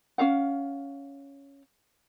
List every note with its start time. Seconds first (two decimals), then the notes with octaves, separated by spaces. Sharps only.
0.18 C#4 G#4 F5 F#5